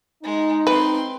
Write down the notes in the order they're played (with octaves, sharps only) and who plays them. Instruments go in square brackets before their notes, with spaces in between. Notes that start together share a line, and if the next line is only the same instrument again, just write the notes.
[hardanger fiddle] G#3 [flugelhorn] D#4
[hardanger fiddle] C4 C6 [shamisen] B4